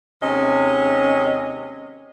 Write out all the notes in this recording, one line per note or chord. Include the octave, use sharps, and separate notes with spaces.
D#2 C3 G#3 C#4 D#5